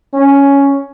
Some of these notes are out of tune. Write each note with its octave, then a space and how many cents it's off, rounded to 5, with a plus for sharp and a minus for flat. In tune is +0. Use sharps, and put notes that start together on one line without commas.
C#4 +5